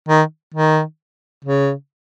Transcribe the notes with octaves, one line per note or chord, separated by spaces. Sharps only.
D#3
D#3
C#3